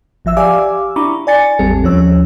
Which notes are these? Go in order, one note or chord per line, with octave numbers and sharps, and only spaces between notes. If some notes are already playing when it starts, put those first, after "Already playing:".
G#1 F3 E5 E6
G4 D5 F5 G#5 D6 E6
D4 E4 A#5 B5 C#6 D6
D5 G#5 A6 C#7
A1 E2 G3 C4 A4
D#2 F3 C#4 C#5 E6